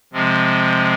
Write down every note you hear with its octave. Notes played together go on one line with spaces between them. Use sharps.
C3 F3 G#3 C4